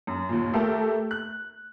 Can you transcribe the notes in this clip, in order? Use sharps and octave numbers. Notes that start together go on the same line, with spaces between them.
F#2
D#2 A#2
A3 G4 A4 A#4
F#6